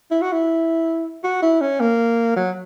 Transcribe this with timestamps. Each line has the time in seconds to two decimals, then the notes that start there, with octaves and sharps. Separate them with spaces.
0.11 E4
0.22 F#4
0.32 E4
1.24 F#4
1.43 E4
1.61 C#4
1.80 A#3
2.36 F#3